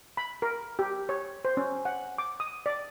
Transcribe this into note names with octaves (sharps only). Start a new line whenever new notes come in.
B5
A#4
G4
C#5
C5
C#4
F#5
D6
D#6
D5